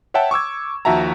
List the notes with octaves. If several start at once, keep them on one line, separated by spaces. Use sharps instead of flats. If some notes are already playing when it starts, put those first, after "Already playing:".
C#5 E5 F#5 G5 A5
C#6 D6 E6 G#6
D#2 F3 F#4 E5 A5 A#5